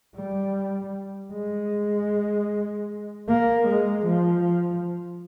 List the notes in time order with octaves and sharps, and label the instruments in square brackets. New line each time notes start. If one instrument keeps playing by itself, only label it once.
[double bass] G3
G#3
A#3
G#3
F3